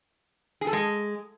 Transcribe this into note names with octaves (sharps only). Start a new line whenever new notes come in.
G#4
A4
G#3